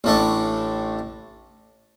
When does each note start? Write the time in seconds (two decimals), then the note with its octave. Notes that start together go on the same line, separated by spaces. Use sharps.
0.04 A1 A2 A3 D4